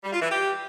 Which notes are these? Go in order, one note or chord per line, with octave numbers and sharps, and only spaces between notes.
G3
F4
E3
G4